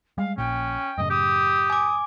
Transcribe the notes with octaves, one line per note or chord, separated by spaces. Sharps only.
G3 G#3 F5
A#1 A#2 C#4 G5
F#2 A2 C#3 D#5
G4 D#6
G#5 D6